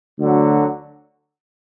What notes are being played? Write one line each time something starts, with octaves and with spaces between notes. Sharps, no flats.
D2 D3 F#3